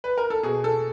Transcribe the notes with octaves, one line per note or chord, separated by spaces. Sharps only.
B4
A#4
A4
B2 G#4
A4